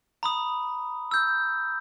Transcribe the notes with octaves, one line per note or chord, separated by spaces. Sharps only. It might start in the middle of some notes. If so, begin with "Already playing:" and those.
A#5 B5 D#6
E6 G6